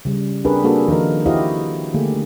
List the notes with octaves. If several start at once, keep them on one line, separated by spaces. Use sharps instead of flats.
C#3 G3
C4 D4 G4 G#4 A#4 B4
A#3 D4 F#4 G#4 A4
D#3 F3 D#4 A#4
E4 F#4 G4 C5 D#5 F5
D3 A3 A#3 G4 G#4